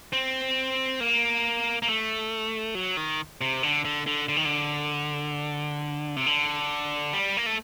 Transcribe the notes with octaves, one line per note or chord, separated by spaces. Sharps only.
C4
A#3
A#3
A3
F#3
D#3
C3
D3
D3
D3
D3
D#3
D3
C3
D3
G3
A#3
A3